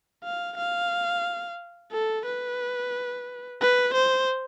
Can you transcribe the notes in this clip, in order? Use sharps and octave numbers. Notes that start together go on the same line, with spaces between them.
F5
F5
A4
B4
B4
C5